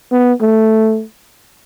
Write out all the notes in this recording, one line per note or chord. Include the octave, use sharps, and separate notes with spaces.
B3
A3